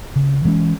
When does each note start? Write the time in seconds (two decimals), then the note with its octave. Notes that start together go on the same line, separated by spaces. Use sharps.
0.16 C#3
0.45 E3 G#3 C#4